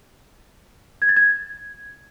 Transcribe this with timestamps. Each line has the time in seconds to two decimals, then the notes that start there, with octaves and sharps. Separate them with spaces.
1.02 G#6
1.09 A6
1.16 G#6